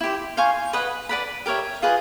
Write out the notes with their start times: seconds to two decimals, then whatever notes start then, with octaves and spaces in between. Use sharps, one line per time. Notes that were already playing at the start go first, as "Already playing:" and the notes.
0.01 E4 G4 C5
0.37 C5 F5 G#5 C#6
0.73 B4 D#5 F#5
1.09 B4 D5 F#5 B5
1.46 G4 A#4 C#5 E5
1.82 F4 G#4 B4 D#5